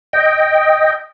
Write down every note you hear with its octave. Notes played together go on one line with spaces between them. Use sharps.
D#5 G5